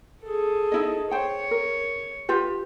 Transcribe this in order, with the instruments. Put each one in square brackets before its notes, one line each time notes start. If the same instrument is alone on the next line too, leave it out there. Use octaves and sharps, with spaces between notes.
[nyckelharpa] G#4 A4
[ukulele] D#4 E4 D#5
[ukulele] C5 G5 [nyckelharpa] C#5
[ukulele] A#4
F4 G4 B4